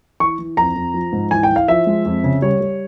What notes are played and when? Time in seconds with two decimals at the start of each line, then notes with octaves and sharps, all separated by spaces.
0.20 E3 C#6
0.39 E3
0.57 F2 A#5
0.76 F2
0.94 F3
1.12 G#2
1.31 E3 G#5
1.43 G5
1.50 E3
1.56 F5
1.68 F3 E5
1.87 G#3
2.05 F2
2.24 C#3
2.42 G3 C#5
2.60 G3